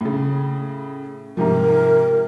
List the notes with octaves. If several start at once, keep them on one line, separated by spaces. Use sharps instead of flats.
A2 C#3
G#2 C3 F3 A#4